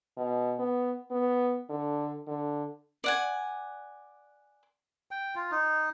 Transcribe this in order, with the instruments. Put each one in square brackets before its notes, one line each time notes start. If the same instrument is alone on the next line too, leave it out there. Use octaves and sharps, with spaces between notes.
[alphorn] B2
B3
B3
D3
D3
[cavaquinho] D5 F#5 G#5
[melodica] G5
F4
D#4